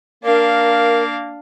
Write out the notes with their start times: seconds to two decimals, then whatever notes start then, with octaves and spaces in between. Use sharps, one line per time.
0.24 A#3 D4 A#4 F5